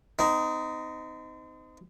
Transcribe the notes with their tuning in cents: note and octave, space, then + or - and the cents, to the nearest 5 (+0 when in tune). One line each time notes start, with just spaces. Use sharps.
C4 -35 D#4 +5